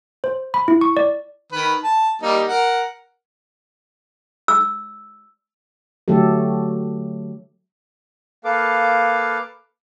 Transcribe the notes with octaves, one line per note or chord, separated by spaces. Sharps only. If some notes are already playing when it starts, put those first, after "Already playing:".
C5
B5
E4
C#6
D5
D#3 B4
A5
G3 A#3 D#4
A#4 F#5
E6
D3 F#3 A3 G4 A4
A#3 A4 B4 F5 D6